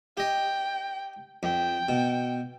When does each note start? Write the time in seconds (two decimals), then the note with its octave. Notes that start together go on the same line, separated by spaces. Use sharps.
0.17 G4 D#5 G5
1.43 F2 G5
1.89 B2